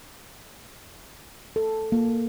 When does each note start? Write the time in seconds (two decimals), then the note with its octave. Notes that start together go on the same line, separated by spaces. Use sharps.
1.56 A4
1.92 A#3